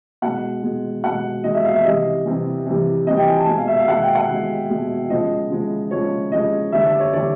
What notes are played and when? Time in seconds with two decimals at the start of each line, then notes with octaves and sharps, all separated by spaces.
0.22 B2 G#3 F#5
0.63 B2 G#3
1.03 B2 G#3 F#5
1.44 B2 G#3 D#5
1.54 E5
1.65 F5
1.75 E5
1.84 C3 E3 G3 D#5
2.26 C3 E3 G3
2.66 C3 E3 G3
3.07 C3 E3 G3 D#5
3.17 G5
3.27 G#5
3.37 A5
3.47 B2 G#3 G#5
3.57 F5
3.68 E5
3.78 F5
3.87 B2 G#3 F#5
4.02 G5
4.15 F#5
4.29 B2 G#3
4.70 B2 G#3
5.09 C#3 F3 G#3 D#5
5.50 C#3 F3 G#3
5.91 C#3 F3 G#3 C#5
6.32 C#3 F3 G#3 D#5
6.72 D3 G3 E5
6.86 D5
7.00 C#5
7.13 D3 G3 D5